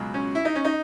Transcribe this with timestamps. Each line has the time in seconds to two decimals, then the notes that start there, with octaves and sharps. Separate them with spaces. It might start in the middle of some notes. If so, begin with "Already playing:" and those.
Already playing: C#2 B2 F#3
0.14 C#4
0.35 E4
0.45 D#4
0.55 C#4
0.65 D#4